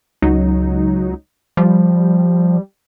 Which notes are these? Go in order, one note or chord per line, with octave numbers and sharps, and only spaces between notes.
C#2 F#3 D#4
F3 G3